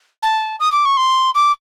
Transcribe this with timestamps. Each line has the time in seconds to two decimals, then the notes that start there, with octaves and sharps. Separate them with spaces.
0.22 A5
0.60 D#6
0.72 D6
0.85 C#6
0.97 C6
1.35 D6